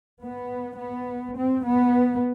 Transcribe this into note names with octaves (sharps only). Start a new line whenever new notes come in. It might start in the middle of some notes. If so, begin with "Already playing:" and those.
B3
B3
C4
B3